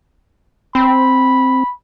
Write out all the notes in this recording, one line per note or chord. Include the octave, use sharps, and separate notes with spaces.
C4 B5